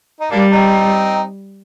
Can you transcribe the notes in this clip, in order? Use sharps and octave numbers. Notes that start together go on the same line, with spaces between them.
D#4
G3 A#3 D4
C4 D#4